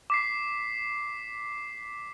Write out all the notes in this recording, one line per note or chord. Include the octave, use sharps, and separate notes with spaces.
D6 B6 C7